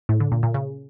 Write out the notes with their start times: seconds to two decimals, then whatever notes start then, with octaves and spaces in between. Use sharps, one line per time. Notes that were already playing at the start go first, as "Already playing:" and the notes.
0.09 A2
0.20 D3
0.32 A#2
0.43 A#2
0.54 C#3